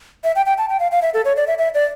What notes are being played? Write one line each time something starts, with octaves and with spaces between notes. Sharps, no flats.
E5
G5
G5
A5
G5
F5
F5
E5
A4
C#5
D5
E5
E5
D5